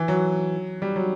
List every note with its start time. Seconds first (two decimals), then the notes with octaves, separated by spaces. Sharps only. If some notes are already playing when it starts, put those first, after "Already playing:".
Already playing: E3
0.08 F#3
0.82 G3
0.96 F#3